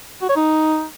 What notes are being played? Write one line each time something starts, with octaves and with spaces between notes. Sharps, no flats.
F#4
C#5
D#4